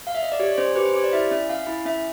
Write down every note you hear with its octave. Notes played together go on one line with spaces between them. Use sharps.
F5
E5
D#5
D5
G4 C#5
C#5
C#4 C5
G4 B4
C5
G4 C#5
D5
E4 E5
C#4 E5
C#4 F5
E4
C#4 E5